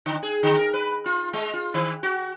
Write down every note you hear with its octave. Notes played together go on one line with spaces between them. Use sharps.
D3
G#4
D3
A#4
B4
F4
G#3
F4
D#3
F#4